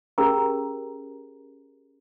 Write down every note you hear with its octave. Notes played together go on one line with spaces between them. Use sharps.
C#4 G4 G#4 A#4 A#5